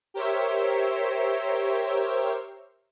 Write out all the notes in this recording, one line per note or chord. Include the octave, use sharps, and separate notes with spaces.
G4 A#4 C5 C#5 E5